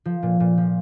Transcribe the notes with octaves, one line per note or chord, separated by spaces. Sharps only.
F3
A#2
A#2
F3